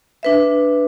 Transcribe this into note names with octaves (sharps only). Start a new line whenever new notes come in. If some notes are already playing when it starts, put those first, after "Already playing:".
D4 B4 E5